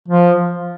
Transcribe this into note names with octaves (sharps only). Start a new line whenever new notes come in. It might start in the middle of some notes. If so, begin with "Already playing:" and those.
F3